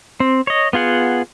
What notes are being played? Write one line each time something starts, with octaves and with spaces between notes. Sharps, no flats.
C4
C#5 D#5
B3 F4 G#4 F#5